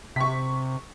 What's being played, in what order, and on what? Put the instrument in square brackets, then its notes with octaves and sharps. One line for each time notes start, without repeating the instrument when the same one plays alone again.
[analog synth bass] C3 [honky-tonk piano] C#6 B6